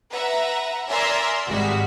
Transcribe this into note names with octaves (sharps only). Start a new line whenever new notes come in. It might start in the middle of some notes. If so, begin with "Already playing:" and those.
B4 E5 F#5 A#5
A#4 D5 E5 G#5 A#5 C6
G#1 G3 G#3 F#4 B6